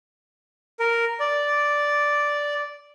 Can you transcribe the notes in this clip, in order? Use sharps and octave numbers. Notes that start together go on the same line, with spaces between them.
A#4
D5